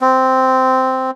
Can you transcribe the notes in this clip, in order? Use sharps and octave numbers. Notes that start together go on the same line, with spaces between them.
C4